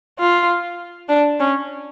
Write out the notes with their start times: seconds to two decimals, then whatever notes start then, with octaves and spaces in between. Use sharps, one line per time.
0.19 F4
1.09 D4
1.40 C#4